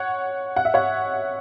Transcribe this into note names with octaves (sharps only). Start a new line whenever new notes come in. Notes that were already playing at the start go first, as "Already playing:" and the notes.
Already playing: C#5 F#5
F#5
E5
C#5 F#5